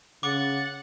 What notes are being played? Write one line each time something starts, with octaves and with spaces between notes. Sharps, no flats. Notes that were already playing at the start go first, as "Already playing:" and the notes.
C#3 F#5 D6 A6